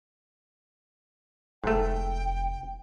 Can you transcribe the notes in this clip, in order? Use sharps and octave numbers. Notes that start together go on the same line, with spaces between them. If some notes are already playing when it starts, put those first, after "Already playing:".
F1 G#2 A3 G5